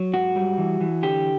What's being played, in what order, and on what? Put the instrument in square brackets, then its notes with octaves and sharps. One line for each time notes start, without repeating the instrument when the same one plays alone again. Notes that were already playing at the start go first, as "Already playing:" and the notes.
Already playing: [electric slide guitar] F#3
G#2 F#4
G3
E3
E3
D3 G4